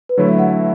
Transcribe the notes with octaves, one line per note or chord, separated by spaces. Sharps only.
B4
D3 F#3 A3 E4 C#5
E5
F#5
E5